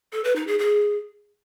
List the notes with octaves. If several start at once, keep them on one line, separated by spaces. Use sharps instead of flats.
A4
B4
D#4
G#4
G#4